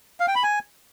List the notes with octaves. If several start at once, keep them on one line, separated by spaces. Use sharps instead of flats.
F5
G5
B5
G#5